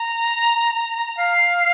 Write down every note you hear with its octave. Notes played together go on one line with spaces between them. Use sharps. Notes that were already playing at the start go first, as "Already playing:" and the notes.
Already playing: A#5
F5